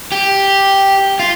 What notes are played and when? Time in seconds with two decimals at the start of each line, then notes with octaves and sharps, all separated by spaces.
0.12 G4
1.19 F4